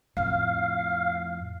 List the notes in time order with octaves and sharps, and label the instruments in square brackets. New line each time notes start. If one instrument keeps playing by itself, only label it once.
[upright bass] F2 A2 [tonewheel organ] F5